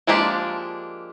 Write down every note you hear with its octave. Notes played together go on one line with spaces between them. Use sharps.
F3 G#3 A#3 D4 G4